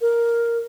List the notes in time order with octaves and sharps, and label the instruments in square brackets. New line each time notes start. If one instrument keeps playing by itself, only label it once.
[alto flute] A#4